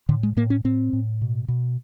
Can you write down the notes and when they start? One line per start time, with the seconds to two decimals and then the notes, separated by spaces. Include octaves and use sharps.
0.09 A2 D3
0.23 G#3
0.37 A2 A#3
0.50 C#4
0.64 A2 C4
0.93 A2
1.22 B2
1.48 B2